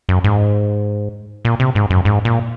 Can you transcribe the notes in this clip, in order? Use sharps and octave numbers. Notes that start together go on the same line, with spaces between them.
F#2
G#2
A#2
C3
G#2
F#2
G#2
A#2